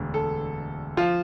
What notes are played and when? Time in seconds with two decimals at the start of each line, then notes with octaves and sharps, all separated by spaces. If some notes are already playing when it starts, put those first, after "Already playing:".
Already playing: E1 D2
0.14 A4
0.97 F3 F4